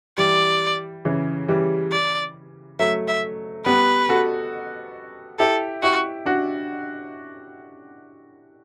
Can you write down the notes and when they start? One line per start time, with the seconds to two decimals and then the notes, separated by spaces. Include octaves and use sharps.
0.18 E3 G3 D5
1.05 C#3 E3
1.48 E3 G3
1.92 D5
2.79 F#3 A3 E5
3.08 E5
3.66 G3 B3 B4
4.09 F#4 A4
5.39 E4 G4 A4
5.82 E4 F#4 G4
6.26 D4 F#4